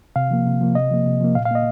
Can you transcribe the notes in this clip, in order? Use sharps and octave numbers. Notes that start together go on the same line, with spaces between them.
C3 F5
F3 A#3
C3
F3 A#3
C3 D#5
F3 A#3
C3
F3 A#3
A#2 F5
F5
A#3 D#5